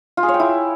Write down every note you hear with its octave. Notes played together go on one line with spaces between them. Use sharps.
F4
G#4
C#5
G5
E4